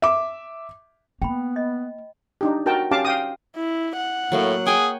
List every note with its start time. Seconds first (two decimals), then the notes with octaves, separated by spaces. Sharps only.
0.02 E5 D6
1.22 A#3 B3 G5 B5
1.56 D#5
2.41 D4 D#4 G4
2.66 F#4 A#4 G5 A5
2.91 C#4 G4 F5 A5 D6
3.05 F5 G5 D#6
3.56 E4
3.98 F#5
4.32 A2 F#3 A#3 F5
4.67 G#4 G5 G#5 C#6